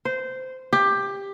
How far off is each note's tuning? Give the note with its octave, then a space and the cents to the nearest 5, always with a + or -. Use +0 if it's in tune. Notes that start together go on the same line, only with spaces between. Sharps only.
C5 -15
G4 +15